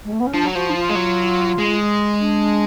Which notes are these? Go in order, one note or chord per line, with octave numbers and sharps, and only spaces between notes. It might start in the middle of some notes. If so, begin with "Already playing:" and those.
G#3
A3
B3
C#4
F3 D4
F#3
F3 F#4
D4
F4
G#3
F#3
G#3
D4